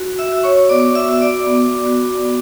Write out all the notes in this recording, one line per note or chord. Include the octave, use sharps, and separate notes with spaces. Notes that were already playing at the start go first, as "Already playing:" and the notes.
Already playing: F#4
E5 E6
F#4
C#5 C#6
B3 D5 D6
E5 E6
F#4
D5 D6
B3
F#4
B3